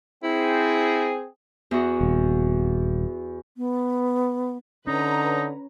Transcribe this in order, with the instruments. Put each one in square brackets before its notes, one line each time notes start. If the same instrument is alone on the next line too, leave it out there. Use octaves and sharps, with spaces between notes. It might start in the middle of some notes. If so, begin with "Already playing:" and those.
[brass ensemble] C4 G#4 [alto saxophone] E4
[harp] E2 F#4
[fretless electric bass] D#1
[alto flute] B3
[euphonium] D3 [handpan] C#4 [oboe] D#4 [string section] B4 C#5 A#5